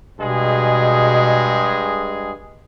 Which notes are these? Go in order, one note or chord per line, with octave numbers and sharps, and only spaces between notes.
G2 B2 G#3 G#4